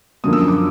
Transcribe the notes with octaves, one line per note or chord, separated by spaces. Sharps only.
F#2 D3 F3 A#3 D#6
E6
D#6
D6